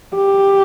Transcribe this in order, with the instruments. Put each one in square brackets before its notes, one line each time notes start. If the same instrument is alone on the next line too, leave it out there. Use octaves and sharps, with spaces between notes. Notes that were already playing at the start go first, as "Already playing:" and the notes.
[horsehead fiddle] G4